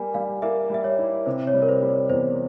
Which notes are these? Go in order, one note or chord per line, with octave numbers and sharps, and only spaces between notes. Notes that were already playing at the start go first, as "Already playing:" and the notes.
Already playing: G3 A#3 G#5
G3 F5
A#3 E5
G3 E5
C#5
E4
C3 C5
C#5
G3
A#4
C5
G3
C#5
E2 C5